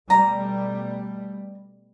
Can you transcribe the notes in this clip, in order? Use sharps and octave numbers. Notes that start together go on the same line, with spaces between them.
B2 G3 A3 A#5